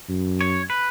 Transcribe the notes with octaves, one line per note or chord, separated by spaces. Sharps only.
F#2
C#5
B4